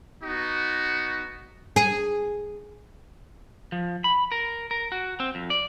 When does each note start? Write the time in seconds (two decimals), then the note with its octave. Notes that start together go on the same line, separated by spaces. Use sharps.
0.24 B3 D#4 F#4
1.76 G#4
3.72 F3
4.04 B5
4.32 A#4
4.71 A#4
4.92 F#4
5.20 C4
5.35 F2
5.50 D5